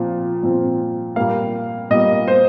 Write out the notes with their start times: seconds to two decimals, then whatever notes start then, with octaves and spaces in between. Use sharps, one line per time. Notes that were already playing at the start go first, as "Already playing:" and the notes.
Already playing: A#2 F3 C4
0.43 A#2 F3 C4
1.16 A#2 G3 A#3 F5
1.90 A#2 G3 A#3 D#5
2.28 C5